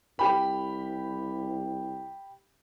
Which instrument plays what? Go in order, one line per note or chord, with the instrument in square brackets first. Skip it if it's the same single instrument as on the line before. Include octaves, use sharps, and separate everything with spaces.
[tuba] C2 [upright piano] G4 B5